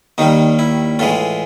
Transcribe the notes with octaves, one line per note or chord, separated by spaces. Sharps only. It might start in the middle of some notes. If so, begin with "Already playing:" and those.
D#2 D#3 G3 D#4
E4
A2 E3 G#3 F4